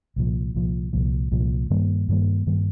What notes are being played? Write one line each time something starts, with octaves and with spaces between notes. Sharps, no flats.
C2 A#2 F3
C2 A#2 F3
C2 A#2 F3
C2 A#2 F3
G2 D#3 G3 A#3
G2 D#3 G3 A#3
G2 D#3 G3 A#3